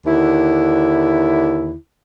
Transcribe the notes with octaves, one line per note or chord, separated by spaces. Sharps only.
D#2 D3 E4